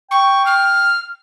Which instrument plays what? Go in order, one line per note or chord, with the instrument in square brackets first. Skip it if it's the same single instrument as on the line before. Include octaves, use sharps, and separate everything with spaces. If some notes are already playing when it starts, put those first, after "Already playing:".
[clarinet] G5 [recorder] C#6
[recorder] F6